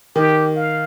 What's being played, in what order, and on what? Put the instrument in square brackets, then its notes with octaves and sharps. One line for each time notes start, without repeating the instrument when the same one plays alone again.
[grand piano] D#3 [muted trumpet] G4
[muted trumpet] F5